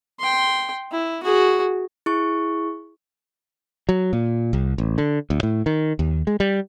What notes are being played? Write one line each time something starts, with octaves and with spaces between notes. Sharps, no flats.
G5 C6
E4
F#4 G#4
E4 G#4 C#6
F#3
A#2
C2
A1
D3
D2
A2
D#3
D#2
G#3
G3